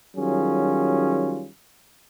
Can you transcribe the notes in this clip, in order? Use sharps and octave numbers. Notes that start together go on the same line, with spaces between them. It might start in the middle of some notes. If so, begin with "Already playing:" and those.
D#3 F#3 G3 C#4 F4 G#4